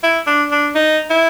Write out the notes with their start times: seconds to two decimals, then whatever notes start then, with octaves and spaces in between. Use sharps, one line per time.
0.03 E4
0.27 D4
0.51 D4
0.75 D#4
1.10 E4